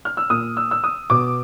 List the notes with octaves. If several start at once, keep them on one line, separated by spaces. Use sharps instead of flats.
F6
E6
A#2 D#6
E6
E6
D#6
B2 D6